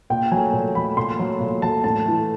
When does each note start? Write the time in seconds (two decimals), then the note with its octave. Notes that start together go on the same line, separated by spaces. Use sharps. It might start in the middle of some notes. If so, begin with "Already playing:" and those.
0.10 A#2 G5
0.32 F#3 A3 G#5
0.53 A#2
0.75 F#3 A3 B5
0.97 A#2 C6
1.19 F#3 A3
1.40 A#2
1.62 F#3 A3 A5
1.84 A2 A5
2.06 E3 A3